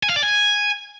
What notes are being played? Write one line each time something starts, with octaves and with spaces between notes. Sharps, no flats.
G#5
F5
D5
G#5